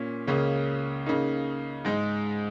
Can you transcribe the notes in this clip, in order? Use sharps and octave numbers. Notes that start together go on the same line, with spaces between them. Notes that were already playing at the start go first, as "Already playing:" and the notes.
Already playing: A#2 A#3 C#4
C#2 C#3 A#3 C#4
C#3 A#3 D#4
G#2 G#3 D#4